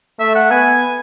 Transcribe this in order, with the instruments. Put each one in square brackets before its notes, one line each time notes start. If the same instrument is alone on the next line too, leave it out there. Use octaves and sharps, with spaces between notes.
[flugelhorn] A3 [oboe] E5
[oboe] F#5
[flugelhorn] B3 [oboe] G#5